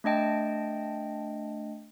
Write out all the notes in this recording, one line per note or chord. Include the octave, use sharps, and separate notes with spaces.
A3 D4 D#5 G5 A5